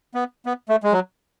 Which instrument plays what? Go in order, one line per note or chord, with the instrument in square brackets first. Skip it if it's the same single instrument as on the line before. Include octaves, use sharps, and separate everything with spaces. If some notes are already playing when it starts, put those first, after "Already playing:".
[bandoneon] B3
B3
A3
G#3
F#3